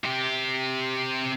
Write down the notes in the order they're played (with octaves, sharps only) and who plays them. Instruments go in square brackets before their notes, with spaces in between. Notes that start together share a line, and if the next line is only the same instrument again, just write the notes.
[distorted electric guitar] C3 G4